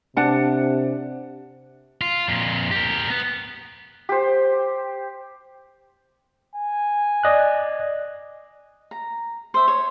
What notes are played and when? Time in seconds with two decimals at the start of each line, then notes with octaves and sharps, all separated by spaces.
0.17 C3 D4 F#5 A5
2.01 F4
2.28 F2 A#2
2.71 G4 A#4
3.10 B3
4.09 G4 C5
6.55 G#5
7.23 D5 D#5 F#6
8.91 A#5
9.54 C5 E5
9.68 C#5